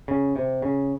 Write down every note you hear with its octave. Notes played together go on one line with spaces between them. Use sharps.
C#3
C3
C#3